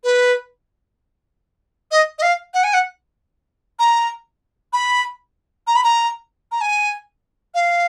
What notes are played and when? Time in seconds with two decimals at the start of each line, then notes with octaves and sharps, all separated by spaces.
0.04 B4
1.91 D#5
2.19 D#5
2.22 F5
2.54 F#5
2.64 G#5
2.73 F#5
3.79 A#5
4.73 B5
5.67 A#5
5.76 B5
5.84 A#5
6.52 A#5
6.61 G#5
7.54 F5